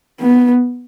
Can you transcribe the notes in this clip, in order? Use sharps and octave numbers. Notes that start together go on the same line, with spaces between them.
B3